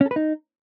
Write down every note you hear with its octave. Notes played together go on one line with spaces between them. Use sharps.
C#4
A4
B4
D#4